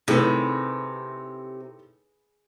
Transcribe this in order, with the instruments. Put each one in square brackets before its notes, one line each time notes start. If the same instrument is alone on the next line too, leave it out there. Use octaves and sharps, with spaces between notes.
[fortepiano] A2 D#3 [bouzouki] C3 [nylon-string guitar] G#4 B4